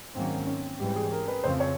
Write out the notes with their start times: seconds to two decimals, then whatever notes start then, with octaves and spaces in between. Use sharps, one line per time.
0.15 G#2 D#3 F#3 A#3 C4 C#4
0.47 C#4
0.79 G#2 E3 G3 G4
0.96 G#4
1.12 A#4
1.28 B4
1.44 F2 C#3 F3 A3 C4 C5
1.60 C#5